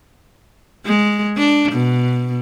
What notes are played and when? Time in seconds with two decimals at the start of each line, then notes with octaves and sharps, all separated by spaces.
0.86 G#3
1.37 D4
1.72 B2